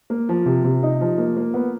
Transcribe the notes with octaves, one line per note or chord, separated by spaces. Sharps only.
A#3
F3
C3
C3
D#4
F3
A#3
A#3
B3